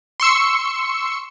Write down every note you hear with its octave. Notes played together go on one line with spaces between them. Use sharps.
C6 C#6 E6 C#7